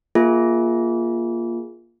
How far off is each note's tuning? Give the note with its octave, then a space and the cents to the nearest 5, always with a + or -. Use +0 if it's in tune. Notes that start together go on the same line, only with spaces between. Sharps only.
A#3 +10 F4 +0 G#4 +0